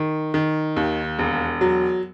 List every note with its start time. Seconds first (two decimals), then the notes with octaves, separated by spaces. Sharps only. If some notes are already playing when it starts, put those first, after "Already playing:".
Already playing: D#3
0.34 D#3
0.76 D#2
1.19 E1
1.61 F#3